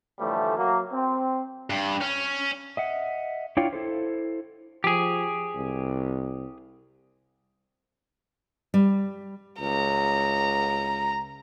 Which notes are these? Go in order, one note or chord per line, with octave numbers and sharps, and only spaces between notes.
A2 D3 E3 F3 G3 A3
F#3 A#3
C4
G2
C#4
D#5 E5 F#5
D4 E4 F4 C#5 F5 G5
E4 A4 C5
F3 G4 G#4
C2
G3
C#2 A#5